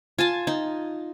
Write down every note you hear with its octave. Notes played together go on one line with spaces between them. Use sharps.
F4 G#5 A5
D#4